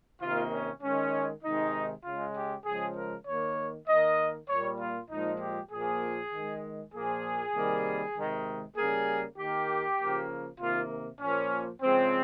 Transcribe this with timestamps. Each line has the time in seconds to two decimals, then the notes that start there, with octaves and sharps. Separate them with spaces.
0.21 C3 D#3 A#3 F4
0.52 C#4
0.82 D#3 G#3 C#4
1.43 C3 D#3 G#3 D#4
2.05 C#3 G#3 F4
2.35 G4
2.65 C#3 F3 G#3 G#4
2.97 A#4
3.27 D#3 A#3 C#5
3.88 D#3 A#3 D#5
4.49 A#2 G3 A#3 C#5
4.79 F4
5.10 A#2 F3 G#3 D#4
5.40 G4
5.72 A#2 F3 A#3 G#4
6.32 D#3 G#3
6.93 A#2 F3 A#3 G#4
7.54 C3 D#3 G3 A#3
8.15 C3 D#3 G#3
8.76 C#3 G3 A#3 G#4
9.38 D#3 A#3 G4
9.99 C#3 F3 A#3
10.60 C3 D#3 A#3 F4
11.20 A#2 F3 A#3 C#4
11.82 C#3 F3 G#3 C4